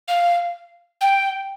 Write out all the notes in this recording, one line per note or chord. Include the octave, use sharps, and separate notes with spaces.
F5
G5